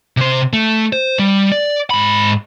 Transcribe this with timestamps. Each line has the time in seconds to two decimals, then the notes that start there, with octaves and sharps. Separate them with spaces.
0.17 C3 C5
0.53 A3
0.93 C5
1.19 G3
1.52 D5
1.90 G#2 B5